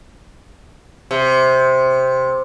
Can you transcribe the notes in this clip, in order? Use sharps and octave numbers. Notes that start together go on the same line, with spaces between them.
C3